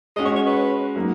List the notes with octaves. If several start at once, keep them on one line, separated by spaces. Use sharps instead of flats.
G#3 C#4 F#4 D#5
C#5
C#5
B4
F#3 A#3 D#4